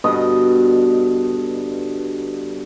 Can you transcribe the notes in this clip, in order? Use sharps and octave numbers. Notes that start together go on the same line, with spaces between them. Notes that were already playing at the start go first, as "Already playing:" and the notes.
G2 B2 D3 D#5